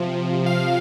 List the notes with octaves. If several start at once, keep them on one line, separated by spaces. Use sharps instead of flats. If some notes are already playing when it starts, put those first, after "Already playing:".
Already playing: C3 F3
F5